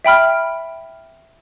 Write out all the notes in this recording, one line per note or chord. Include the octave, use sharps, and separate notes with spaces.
E5 G5 B5 F6